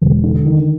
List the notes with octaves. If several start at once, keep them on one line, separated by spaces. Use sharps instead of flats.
E1
D3
D#3